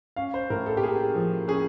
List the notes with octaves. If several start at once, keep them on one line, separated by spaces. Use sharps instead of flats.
C#4 F5
C5
A2 A#4
A4
G4
A#3 G#4
F3
C#4 G#4